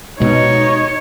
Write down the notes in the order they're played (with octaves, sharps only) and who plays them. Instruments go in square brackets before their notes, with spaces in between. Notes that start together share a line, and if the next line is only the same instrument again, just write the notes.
[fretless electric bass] B2 G#3 [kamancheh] D#4 C#5